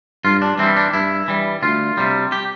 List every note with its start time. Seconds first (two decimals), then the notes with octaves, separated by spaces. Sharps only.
0.25 G2 F4
0.42 D4
0.59 E3 G3 C4
0.76 D4
0.93 G2 E4
1.28 E3 G3
1.62 D2 F4
1.97 C3 G3
2.32 G4